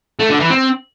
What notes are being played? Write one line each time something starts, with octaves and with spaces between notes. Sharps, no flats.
A3
D3
E3
C4